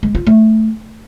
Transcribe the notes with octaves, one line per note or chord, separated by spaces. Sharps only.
G#3
F4
A3